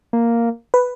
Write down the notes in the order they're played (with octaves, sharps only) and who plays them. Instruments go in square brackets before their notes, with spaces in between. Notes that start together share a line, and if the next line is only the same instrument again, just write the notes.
[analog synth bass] A#3
[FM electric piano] B4